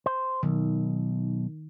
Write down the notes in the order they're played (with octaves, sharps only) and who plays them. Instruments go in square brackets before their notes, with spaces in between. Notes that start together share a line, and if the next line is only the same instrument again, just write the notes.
[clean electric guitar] C5
[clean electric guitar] B1 [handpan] D#3